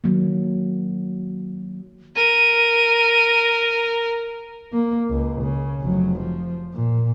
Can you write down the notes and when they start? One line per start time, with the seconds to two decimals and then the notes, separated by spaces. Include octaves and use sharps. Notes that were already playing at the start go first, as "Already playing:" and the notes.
0.04 D#3 F#3 A#3
2.16 A#4 D#7
4.73 A#3
5.10 C#2
5.42 C#3
5.82 F1 F#3
6.20 F3
6.74 A#2